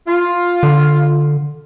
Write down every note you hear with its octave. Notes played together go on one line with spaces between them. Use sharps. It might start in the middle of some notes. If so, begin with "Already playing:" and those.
F4
D3